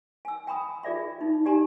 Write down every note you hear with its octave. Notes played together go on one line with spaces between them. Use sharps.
G#5 E6
G5 A#5 B5 D#6
F4 G#4 D5 E5 B5
D#4
D#4 G4 D5 G#5 A#5 C6